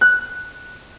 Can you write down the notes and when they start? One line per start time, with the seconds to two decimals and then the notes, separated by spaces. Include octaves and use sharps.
0.01 F#6